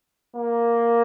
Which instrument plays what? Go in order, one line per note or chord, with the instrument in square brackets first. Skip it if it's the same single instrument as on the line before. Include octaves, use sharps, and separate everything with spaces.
[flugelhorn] A#3